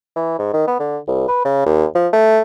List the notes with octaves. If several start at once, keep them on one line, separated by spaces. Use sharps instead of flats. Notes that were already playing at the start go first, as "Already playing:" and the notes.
E3
G#2
D#3
B3
D3
C2
B4
C#3
D#2
F3
A3